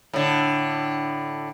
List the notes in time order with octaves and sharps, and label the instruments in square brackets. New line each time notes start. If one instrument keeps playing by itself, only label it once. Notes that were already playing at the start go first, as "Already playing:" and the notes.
[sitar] A2 D3